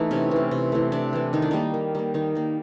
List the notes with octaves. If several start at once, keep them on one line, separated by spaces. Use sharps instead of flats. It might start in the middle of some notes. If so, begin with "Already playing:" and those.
Already playing: E3 A3 D#4
C3 C#4
E3 A3
C3
E3 A3
C3 D4
E3 A3
D#3 D#4
D4
G3 A#3 D#4
D#3
G3 A#3
D#3 D#4
G3 A#3